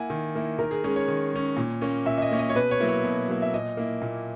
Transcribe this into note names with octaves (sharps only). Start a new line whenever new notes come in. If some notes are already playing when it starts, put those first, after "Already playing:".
Already playing: A#3 E4 F#5 G#5
D#3
A#3 E4
D#3 A#4
G#4
G#3 C#4 G#4
C#5
D#3
G#3 C#4
A#2
A#3 C#4
A#2 E5
E5
D#5
A#3 C#4
D#5
C#5
B2 B4
C#5
F#3 A#3 E4
C#5
B2
F#3 A#3 E4
E5
A#2 D#5
A#3 E4
A#2